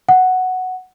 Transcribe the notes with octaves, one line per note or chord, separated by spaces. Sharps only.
F#5